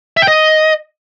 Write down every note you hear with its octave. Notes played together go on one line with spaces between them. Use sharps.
E5
G5
D#5